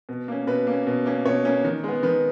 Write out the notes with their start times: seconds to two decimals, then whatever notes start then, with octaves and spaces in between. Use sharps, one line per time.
0.09 B2
0.28 A#3 C#4
0.47 B2 B4
0.67 A#3 C#4
0.87 B2
1.06 A#3 C#4
1.26 B2 C#5
1.45 A#3 C#4
1.64 D#3
1.84 G#3 B3
2.03 D#3 B4